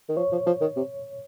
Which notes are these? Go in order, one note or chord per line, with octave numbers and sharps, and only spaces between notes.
D#3
F3 C#5
F3
F3
D#3
C3